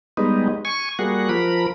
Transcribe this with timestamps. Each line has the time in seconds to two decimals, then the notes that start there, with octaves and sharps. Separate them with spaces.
0.17 G3 G#3 B3 D#4
0.65 G#5 C#6
0.99 G3 A#3 F#4 G#4 F#5
1.29 F3 A#4 B5